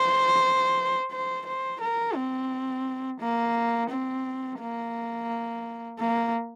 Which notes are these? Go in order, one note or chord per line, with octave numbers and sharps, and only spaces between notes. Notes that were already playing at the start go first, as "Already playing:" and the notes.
Already playing: C5
C5
C5
A#4
C4
A#3
C4
A#3
A#3